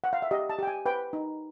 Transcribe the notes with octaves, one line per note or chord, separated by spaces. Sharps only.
F#5
F5
E5
G4 D#5
A5
G4 G5
G#5
B4 G5
D#4